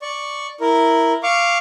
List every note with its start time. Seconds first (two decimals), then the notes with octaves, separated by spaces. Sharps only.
0.02 D5 C#6
0.61 E4 A#4
1.23 F5 C#6 D6